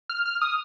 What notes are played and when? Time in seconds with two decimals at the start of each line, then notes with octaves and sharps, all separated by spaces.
0.09 F6
0.26 F6
0.41 D#6